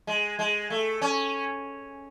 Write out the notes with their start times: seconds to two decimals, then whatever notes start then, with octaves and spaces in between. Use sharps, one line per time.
0.07 G#3
0.39 G#3
0.70 A3
1.01 C#4